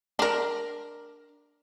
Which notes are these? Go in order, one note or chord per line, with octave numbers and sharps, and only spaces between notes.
D4 A#4